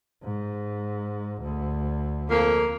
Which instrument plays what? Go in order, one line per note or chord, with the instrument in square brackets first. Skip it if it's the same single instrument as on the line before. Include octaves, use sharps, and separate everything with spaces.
[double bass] G#2
D2
[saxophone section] F2 A#3